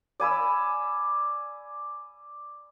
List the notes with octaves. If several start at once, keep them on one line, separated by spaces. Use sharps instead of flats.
D5 G#5 B5 E6